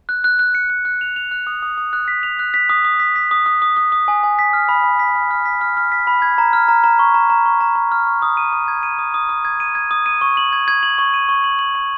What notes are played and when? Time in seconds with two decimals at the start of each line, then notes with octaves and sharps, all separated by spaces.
0.09 F#6
0.24 F#6
0.39 F#6
0.55 C#7
0.70 F#6
0.85 F#6
1.01 F7
1.16 F7
1.31 F#6
1.47 D#6
1.62 D#6
1.78 D#6
1.93 F#6
2.08 B6
2.23 F7
2.39 F#6
2.54 B6
2.70 D#6
2.85 D#6
3.00 B6
3.16 B6
3.31 D#6
3.46 D#6
3.62 D#6
3.77 D#6
3.92 D#6
4.08 G#5
4.23 G#5
4.39 B6
4.53 F6
4.69 B5
4.84 B5
4.99 B6
5.15 F6
5.31 F6
5.45 B6
5.61 F6
5.77 F6
5.92 B6
6.07 B5
6.22 G#6
6.38 A#5
6.53 F6
6.68 A#5
6.84 A#5
6.99 C#6
7.14 A#5
7.30 A#5
7.46 C#6
7.61 A#5
7.76 A#5
7.92 F6
8.07 C#6
8.22 D#6
8.37 D#7
8.53 D#6
8.68 G#6
8.83 D#7
8.99 D#6
9.14 D#6
9.29 D#6
9.45 G#6
9.60 D#7
9.75 G#6
9.91 D#6
10.06 D#7
10.21 C#6
10.37 F#7
10.53 G#6
10.68 G#6
10.83 F#7
10.98 C#6
11.14 D#7
11.29 C#6
11.44 F#7
11.59 F#7
11.75 C#6